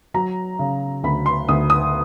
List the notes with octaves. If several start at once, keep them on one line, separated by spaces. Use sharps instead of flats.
F#3 A#5
C#3
D2 B5
C6
D2 D#6
D#6